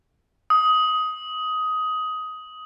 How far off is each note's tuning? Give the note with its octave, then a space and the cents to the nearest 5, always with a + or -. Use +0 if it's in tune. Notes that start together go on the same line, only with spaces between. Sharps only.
D#6 +15